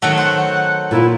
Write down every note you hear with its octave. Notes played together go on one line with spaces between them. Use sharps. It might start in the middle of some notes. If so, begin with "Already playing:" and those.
D#3 F#3 A3 F#5
C5 F#5
A#2 A#3 E4 F4